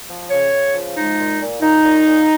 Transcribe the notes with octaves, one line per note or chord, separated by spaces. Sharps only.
F3
C#3 C#5
C#3
F3
G#3 D#4
A#2
A#2
A#2 D#4
A#2
A#2